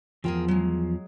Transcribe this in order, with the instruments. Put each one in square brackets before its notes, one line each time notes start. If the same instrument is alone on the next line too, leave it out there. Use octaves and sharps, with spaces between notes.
[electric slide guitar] E2 F3 [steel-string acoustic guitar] G#4 A#4 G5
[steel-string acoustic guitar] F#3 G#3